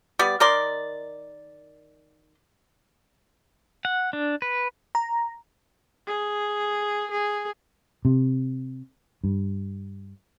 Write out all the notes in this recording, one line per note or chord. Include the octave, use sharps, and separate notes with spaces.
G3 B3 D5
D#3 A#4 D5 C6
F#5
D4
B4
A#5
G#4
G#4
C3
G2